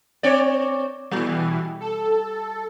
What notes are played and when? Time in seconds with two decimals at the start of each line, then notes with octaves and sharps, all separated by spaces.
0.23 C4 C#5 D5
1.11 B2 E3 G3
1.80 A4